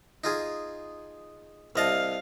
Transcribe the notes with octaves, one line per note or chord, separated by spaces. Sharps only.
D#4 F4 G#4
C2 D#5 F5 A5